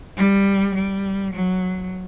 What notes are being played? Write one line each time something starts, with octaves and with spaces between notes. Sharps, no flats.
G3
G3
F#3